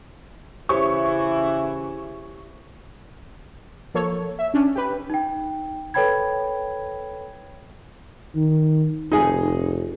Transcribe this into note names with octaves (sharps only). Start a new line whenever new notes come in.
C#3 E3 E4 G4 C5 C#5 C#6
F3 A#3 A4 C#5
E5
C#4 D4
G4 B4
D#4 G5
A4 B4 C#5 G5 B5 G#6
D#3
F1 D#4 G#4